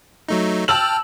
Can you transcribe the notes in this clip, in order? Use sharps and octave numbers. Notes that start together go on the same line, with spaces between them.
F#3 A3 D#4
G5 A5 E6 F6 F#7